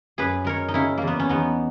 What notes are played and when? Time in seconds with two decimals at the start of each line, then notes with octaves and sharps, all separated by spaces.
0.18 F#2 G#4 B4
0.44 G#3 A#4 C#5
0.68 D#4
0.74 C#3 C#4 E4
0.98 E2 A#3
1.07 B3
1.20 C#4
1.29 E2 B3 D#4